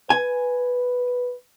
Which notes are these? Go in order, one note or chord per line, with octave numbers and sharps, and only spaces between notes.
B4 G#5